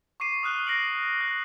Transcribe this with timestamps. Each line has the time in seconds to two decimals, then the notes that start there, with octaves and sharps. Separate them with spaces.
0.20 C#6 D6 C7 D#7
0.43 D#6 F6 F#6 D#7 G7
0.67 A#6 C7 D7 F#7
1.21 F#6